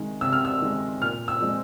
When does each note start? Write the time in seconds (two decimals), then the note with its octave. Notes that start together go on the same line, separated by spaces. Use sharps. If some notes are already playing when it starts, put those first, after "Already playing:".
Already playing: C3 D#3 G#3
0.21 C3 E6
0.32 F6
0.45 E6
0.62 D#3 G#3
1.01 A#2 F6
1.28 E6
1.41 F3 G#3 C4